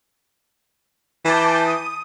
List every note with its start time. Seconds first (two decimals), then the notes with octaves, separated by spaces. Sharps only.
1.25 E3 A5 D6 G6
1.64 D#6